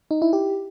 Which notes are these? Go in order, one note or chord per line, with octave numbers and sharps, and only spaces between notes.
D#4
E4
G4